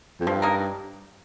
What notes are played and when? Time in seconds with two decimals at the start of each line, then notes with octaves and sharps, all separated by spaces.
0.20 F2
0.27 G2 F3
0.42 A#3 D#4 A#4